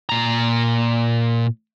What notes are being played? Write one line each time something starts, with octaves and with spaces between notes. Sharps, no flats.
A#2 A#5